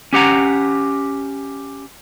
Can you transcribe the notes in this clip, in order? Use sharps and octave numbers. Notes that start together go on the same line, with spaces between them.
C#4 G4 F#5 A#5